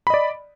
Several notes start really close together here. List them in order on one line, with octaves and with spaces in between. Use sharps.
B5 D#5 D5